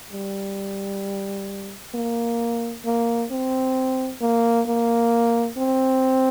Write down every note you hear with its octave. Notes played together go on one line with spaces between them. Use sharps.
G3
A#3
A#3
C4
A#3
A#3
C4